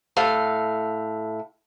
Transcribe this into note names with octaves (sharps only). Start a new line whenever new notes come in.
A2 A4 F5